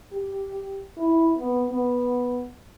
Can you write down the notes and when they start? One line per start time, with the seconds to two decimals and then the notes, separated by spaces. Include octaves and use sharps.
0.13 G4
0.97 E4
1.38 B3
1.70 B3